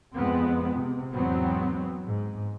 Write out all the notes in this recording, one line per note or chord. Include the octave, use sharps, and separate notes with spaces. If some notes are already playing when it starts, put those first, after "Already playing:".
F2 G#3 B3 C4
C3
E2 G#2 F#3 B3 C4
G#2